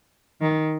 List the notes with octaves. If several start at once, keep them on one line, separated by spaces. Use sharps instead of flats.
D#3